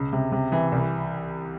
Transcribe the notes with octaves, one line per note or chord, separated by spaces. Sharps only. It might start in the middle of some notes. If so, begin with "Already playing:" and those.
Already playing: C#2
C3
C3
E3
C2